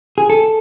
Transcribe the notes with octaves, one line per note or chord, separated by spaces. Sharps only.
G#4
A4